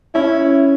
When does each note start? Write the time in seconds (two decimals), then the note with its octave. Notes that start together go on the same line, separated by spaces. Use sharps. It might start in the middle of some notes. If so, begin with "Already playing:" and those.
0.15 C#4 E4